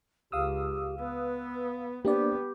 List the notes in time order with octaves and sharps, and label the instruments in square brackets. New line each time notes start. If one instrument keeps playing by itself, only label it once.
[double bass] C#2 [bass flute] G4 [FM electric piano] F5 D#6 E6
[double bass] B3 [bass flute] B4
[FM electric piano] A#3 D4 D5 [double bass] B3 [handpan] G4 [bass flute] C5